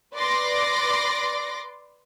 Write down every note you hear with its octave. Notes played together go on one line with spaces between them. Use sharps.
B4 D5 C6 D6 A#6